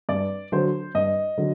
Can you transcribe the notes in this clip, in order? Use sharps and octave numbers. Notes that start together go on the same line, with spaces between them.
G2 D5
D3 F#3 C5
G2 D#5
D3 F#3